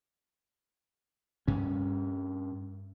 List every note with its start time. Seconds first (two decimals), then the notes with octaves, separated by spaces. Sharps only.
1.47 G2 C#4